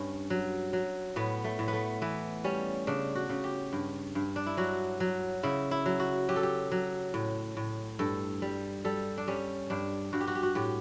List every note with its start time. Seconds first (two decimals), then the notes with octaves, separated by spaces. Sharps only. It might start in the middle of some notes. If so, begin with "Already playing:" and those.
Already playing: G2 C#4
0.30 F#3
0.73 F#3
1.16 A2 B3
1.44 A3
1.59 A2
1.68 B3
1.73 A3
2.02 E3 B3
2.44 G3 C#4
2.87 C#3 D4
3.15 F#4
3.30 C#3
3.44 G4
3.73 G2
4.15 G2
4.36 D4
4.46 E4
4.57 F#3 F#4
5.00 F#3
5.43 C#3 E4
5.71 E4
5.86 F#3
6.00 F#4
6.29 F#3 G4
6.36 A4
6.43 G4
6.72 F#3
7.14 A2
7.57 A2
7.99 G2 A4
8.42 G3
8.85 G3 A4
9.18 D4
9.28 G3 C#4
9.70 G2 D4
10.13 G2 F#4
10.21 G4
10.27 F#4
10.35 G4
10.43 F#4
10.55 A2 G4